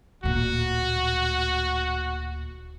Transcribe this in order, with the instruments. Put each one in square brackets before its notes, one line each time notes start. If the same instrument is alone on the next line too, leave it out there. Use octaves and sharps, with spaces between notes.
[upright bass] D1 A#2 [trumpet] F#4